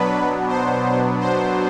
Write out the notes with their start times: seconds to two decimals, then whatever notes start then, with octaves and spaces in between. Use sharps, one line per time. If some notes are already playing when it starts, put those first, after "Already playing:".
Already playing: B2 F#3 B3 D4 B4
0.48 C5
1.20 C5